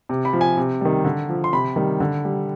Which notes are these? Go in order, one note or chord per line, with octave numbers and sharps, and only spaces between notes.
C3
B5
F3
G#5
C3
D#3 G3
D3
F3
C6
C3 B5
D#3 G3
D3
G3